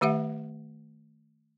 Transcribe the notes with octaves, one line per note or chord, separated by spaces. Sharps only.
D#3 A3 G4 E5 F#5